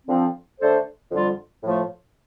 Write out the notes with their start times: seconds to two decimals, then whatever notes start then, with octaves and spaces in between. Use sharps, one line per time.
0.07 D3 F3 C4
0.60 D3 A3 D4 A4 C5
1.11 F2 D3 G3 F4
1.63 A2 F3 A3